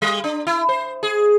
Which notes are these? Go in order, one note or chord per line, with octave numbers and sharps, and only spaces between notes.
G3
D4
E4
C5
G#4